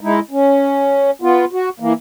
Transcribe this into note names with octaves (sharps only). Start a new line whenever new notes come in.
G#3 D#4 E4
C#4
B3 F4
F#4
E3 A#3